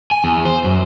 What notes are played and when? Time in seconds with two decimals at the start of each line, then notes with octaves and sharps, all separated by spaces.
0.11 G#5
0.24 E2
0.45 C5
0.64 F#2